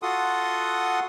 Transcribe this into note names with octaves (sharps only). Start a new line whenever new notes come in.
F4 F#4 A4 F#5 C6 D#6